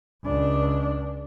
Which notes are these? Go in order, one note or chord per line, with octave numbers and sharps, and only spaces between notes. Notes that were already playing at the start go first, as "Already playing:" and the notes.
C#2 D4